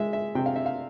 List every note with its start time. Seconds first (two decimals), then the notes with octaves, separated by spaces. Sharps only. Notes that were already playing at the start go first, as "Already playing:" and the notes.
Already playing: G#3 E5
0.13 E5
0.35 C3 G5
0.46 F5
0.56 E5
0.66 F5